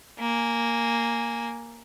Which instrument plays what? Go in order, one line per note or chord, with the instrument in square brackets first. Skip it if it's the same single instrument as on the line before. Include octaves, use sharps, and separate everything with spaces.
[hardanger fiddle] A#3 G#5